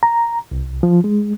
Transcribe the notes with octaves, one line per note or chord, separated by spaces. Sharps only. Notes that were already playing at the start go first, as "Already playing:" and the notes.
A#5
C2
F3
G#3